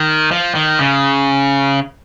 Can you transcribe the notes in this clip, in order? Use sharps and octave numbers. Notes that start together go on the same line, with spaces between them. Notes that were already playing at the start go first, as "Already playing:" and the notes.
Already playing: D#3
F3
D#3
C#3